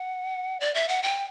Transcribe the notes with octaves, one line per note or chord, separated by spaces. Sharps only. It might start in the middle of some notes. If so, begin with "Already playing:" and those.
Already playing: F#5
D5
E5
F#5
G5